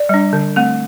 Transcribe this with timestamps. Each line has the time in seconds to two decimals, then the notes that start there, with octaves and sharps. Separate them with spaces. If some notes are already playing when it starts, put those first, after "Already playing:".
Already playing: D5
0.09 G3 D4
0.33 D3
0.56 A3 C4